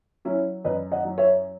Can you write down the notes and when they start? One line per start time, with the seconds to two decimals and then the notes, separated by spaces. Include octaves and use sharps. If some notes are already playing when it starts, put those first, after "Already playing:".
0.25 F#3 C#4 E4
0.64 F#2 B4 D#5
0.92 D#5 F#5
1.05 F#3
1.18 C#5 E5